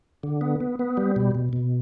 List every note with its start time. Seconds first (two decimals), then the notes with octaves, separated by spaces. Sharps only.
0.23 D3
0.41 B3
0.60 B3
0.79 B3
0.97 G3
1.16 B2
1.35 B2
1.53 B2